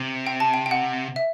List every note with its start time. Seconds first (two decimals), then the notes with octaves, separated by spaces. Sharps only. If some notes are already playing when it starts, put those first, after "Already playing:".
Already playing: C3
0.27 G5
0.40 A5
0.54 G5
0.66 G5
0.71 F#5
1.16 E5